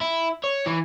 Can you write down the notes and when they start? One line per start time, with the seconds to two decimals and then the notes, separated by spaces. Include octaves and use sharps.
0.01 E4
0.44 C#5
0.66 E3